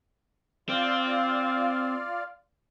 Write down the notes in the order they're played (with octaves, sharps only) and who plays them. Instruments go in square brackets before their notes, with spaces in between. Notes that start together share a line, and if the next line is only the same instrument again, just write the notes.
[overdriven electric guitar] C4 [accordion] F4 D5 F5